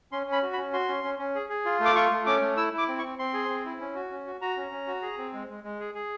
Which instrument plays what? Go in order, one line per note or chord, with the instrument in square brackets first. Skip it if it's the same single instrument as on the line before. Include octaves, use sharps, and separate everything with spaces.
[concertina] C#4 C6
C#4
B5
F#4
B5
C#4
F#4 C6
C#4
C#4
C#4
G#4
G#4
F4
A3
D6
F4 C#6
A3
C#4 D6
A3
E4 E6
E4 D6
C4
C#6
C4
C4 C6
G#4
C4
E4
C#4
F#4
C#4
F#4
F#4 A#5
C#4
C#4
F#4
G#4
C4
G#3
G#3
G#3
G#4
G#4